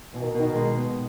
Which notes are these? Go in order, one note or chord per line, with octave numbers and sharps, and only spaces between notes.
B2 E3
D#3
B2
D#3
G#3
B3